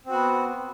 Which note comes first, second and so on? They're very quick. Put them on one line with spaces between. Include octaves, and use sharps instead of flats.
C4 F#4 B3